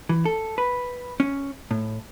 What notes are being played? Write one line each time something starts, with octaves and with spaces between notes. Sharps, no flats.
E3
A4
B4
C#4
A2